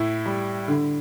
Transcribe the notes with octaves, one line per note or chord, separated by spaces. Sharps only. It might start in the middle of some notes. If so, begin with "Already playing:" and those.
Already playing: A2 E4
G3
D3